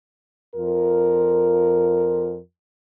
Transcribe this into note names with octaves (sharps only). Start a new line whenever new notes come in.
F2 F4 A#4